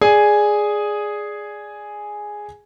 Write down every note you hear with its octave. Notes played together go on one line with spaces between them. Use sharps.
G#4 D5 G#5